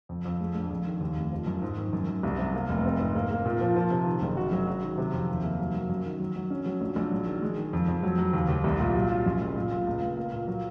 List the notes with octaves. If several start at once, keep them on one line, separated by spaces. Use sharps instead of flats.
F2
F2
G#3
A#1
F2
D#3
D#2
F1
F3
F#2
G#2
D#3
F#2
F#2
C2
C3
A#3
F1
C4
G#2
A#3
A#3
A#2
F3
F3
C3
D#3
F#1
F#4
F#3
F#3
D#3
C3
F2
D#2
A#3
F#3
F#3
F#2
D#3
F#3
F#3
C#4
F#3
A#1
A#1
F#3
D#3
G#3
D#3
F2
F2
F#3
F#3
D#2
D#2
C2
A#2
F#3
F4
F#2
F#1
A#2
A#2
C#2
C#2
A#3
A#2
F#3